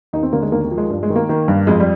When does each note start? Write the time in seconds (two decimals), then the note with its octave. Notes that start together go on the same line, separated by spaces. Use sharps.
0.13 D#2 D#4
0.23 C4
0.33 D3 A#3
0.42 G#3
0.52 D#2 A#3
0.64 A#3
0.71 F3
0.77 G#3
0.90 G2 G3
1.03 G#3
1.10 D#3
1.16 A#3
1.29 D#3
1.48 G2
1.67 F2 G#3
1.80 G3